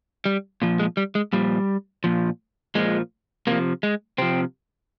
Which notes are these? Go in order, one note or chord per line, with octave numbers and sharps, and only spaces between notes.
G3
A#2 F3
G#3
G3
G#3
A#2 F3 G3
A#2 F3
A#2 F3 G#3
C3 F3 A#3
G#3
C3 F3 C4